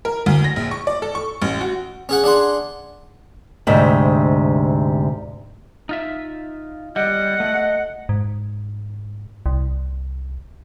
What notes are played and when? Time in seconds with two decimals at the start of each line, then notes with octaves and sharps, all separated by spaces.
0.05 A#4
0.26 D2
0.44 A#6
0.56 A#1
0.71 C#6
0.87 D5
1.02 A4
1.15 C#6
1.42 A1
1.61 F#4
2.09 C#4 G#4 F#5
2.24 D4 G#4 F#5 C6
3.67 D2 G#2 C3
5.89 D#4 F4 E5
6.96 G3 D#5 F#5
7.40 A3
8.09 G#2
9.46 C2